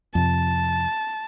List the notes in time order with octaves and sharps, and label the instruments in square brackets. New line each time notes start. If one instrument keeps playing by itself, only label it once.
[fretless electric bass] F2 C3 [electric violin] A5